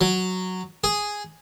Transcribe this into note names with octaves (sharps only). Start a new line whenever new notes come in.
F#3
G#4